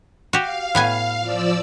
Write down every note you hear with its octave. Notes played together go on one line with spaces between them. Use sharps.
F#4 G4 F5
A2 B3 G#5
F3 D5 E6